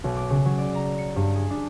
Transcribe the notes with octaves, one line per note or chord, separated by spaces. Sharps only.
B1
D6
C#3
F#3
D5
A#5
C#7
G2
G#4
D4